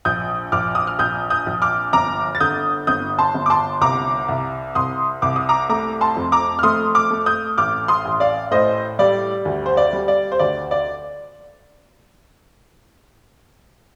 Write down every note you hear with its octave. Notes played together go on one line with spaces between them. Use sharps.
A#1 D#6 G6
A#1 D6 F6
D#6
F6
A#1 D#6 G6
D#6 G6
A#1
D6 F6
G1 A#5 D6
A6
D3 D#6 G6
G1 D#6 G6
A5 C6
G1
D6
A5 C6
C2 A#5 D6
C2
C2 C6 D#6
C2 D6
D#6
A#5 D6
A3 A#5 D6
A5 C6
F2
A#5 D6
F6
A3 C6 D#6
D6 F6
A3
D#6 G6
A1 D6 F6
C6 D#6
A1
D5 F5
A2 C5 D#5
G3 D5
D2
C5
D5
G3
D5
C5
D2 D5
D5